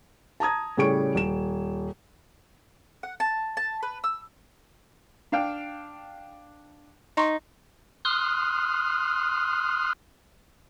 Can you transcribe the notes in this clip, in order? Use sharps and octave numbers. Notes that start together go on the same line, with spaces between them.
A5 A#5 D#6 G#6
A2 C#3 G3 G#4 C#6 D7
D#1 E7
F#5
A5
A5
B4
E6
D4 F5 G5
D#4 A#5 C6 C#6
C6 D#6 F6 F#6